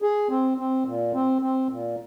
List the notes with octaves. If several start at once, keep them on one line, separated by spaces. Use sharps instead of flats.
G#4
C4
C4
A#2
C4
C4
A#2